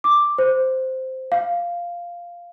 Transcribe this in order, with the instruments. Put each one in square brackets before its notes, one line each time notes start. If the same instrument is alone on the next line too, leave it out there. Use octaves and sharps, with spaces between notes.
[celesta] D6
C5
F5